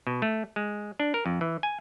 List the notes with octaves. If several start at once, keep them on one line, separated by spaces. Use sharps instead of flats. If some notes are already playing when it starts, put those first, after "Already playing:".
B2
A3
G#3
D4
A#4
F2
E3
G#5